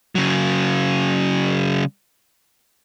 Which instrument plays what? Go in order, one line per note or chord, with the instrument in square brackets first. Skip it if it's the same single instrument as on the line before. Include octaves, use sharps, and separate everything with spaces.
[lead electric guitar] C#3 F#3